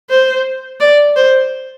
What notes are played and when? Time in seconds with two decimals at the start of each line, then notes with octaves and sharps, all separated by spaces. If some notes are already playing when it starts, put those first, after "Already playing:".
0.10 C5
0.80 D5
1.16 C5